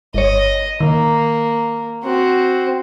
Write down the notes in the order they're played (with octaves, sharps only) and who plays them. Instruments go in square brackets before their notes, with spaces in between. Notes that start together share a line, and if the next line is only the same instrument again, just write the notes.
[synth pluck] G1 C#5 [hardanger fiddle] D#5
[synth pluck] D#3 [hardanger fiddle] A#3
[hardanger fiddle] C4 F#4